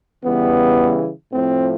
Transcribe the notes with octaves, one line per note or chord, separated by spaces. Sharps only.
C#3 E3 G3 B3
A2 F3 C4